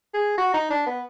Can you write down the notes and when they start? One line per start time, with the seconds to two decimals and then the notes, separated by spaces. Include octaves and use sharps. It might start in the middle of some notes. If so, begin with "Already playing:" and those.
0.14 G#4
0.38 F#4
0.54 D#4
0.70 D4
0.87 B3